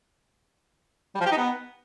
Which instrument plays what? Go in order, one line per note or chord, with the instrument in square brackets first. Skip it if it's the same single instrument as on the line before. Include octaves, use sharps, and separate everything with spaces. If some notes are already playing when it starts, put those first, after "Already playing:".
[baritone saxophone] G3
F3
G4
D#4
B3